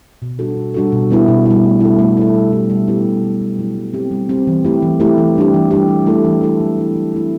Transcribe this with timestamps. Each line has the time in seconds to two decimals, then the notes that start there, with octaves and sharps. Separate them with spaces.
0.22 B2
0.39 G3 D4 F#4 A4
0.57 B2
0.74 G3 D4 F#4 A4
0.92 B2
1.11 G3 B3 E4
1.28 B2
1.46 G3 B3 E4
1.64 A3
1.81 E4 A4
1.99 A3
2.17 E4 A4
2.35 G3
2.52 B3 E4 G4
2.70 G3
2.88 B3 E4 G4
3.06 B2
3.23 F#3 A3 E4
3.41 B2
3.59 F#3 A3 E4
3.76 G3
3.94 C4 G4
4.11 G3
4.29 C4 G4
4.47 E3
4.64 A3 E4 G4
4.82 E3
5.00 A3 E4 G4
5.18 E3
5.36 G3 D4 G4
5.54 E3
5.71 G3 D4 G4
5.88 E3
6.06 A3 E4 A4
6.24 E3
6.41 A3 E4 A4
6.60 F#3
6.77 A3 C4 E4
6.96 F#3
7.13 A3 C4 E4